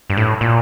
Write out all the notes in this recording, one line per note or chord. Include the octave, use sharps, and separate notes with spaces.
G2
A2
A#2